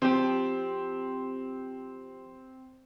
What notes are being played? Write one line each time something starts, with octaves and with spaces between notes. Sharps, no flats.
F3 C4 G4